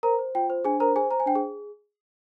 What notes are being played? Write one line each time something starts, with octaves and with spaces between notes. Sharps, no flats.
A#4 C5 A#5
C5
F4 G5
C5
D4 G#4 G#5
A#4 C5 A#5
G#4 C5 G#5
C5 A#5
G#5
D4 G5
G#4